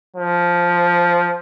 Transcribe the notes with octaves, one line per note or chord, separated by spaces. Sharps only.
F3